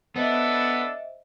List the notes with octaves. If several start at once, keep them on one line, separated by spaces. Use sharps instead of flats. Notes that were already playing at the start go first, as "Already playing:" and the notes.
B3 D4 A4 C5 D#5 E5